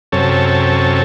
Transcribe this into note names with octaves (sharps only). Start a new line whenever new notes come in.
F#2 C3 C#4 A4